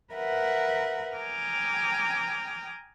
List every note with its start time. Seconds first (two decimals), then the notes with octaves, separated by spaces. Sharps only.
0.13 A#4 B4 E5 F#5
1.17 G5 G#5 A#5 D6 D#6 F6